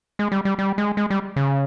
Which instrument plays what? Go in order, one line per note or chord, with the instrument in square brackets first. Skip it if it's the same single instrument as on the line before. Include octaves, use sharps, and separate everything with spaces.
[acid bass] G#3
G3
G3
G3
G#3
G#3
G3
C#3